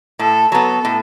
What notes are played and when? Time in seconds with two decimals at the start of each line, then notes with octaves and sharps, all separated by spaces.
0.19 A2 A4
0.52 F#3 B3 A4
0.85 A2